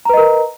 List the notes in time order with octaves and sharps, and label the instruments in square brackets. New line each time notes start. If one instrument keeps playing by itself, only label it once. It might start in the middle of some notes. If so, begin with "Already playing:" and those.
[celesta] A#5
B4
D#5
A#4